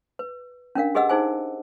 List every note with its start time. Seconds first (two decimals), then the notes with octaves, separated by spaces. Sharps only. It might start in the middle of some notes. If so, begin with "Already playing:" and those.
0.19 B4
0.75 C#4 D4 A#4 F5
0.95 G4 G#4 B4 D#5 F#5 E6
1.09 D#4 G#4 C5 G#5